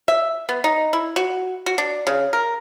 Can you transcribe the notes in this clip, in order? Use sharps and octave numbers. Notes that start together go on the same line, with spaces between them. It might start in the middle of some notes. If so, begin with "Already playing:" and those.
E5
B3
D#4
E4
F#4
F#4
D4
C#3
A#4